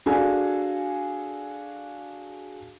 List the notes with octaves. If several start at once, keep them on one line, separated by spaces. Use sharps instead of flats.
D4 F#4 G#4 A4 F5 G#5